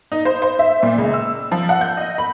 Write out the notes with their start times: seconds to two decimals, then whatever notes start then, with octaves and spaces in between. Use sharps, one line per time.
0.12 D#4
0.25 C5
0.42 C5
0.59 E5
0.83 A#2
0.98 C#2
1.14 E6
1.52 F3
1.69 F#5
1.81 G6
1.97 D#5
2.18 B5